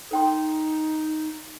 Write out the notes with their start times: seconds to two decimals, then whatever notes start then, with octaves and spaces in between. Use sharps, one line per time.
0.11 D#4 A4 G5 C6